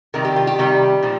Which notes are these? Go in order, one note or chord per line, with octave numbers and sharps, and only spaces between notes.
C3 D#3 G3 A#4
G4
F4
G4
C3 D#3 G3
A#2 F3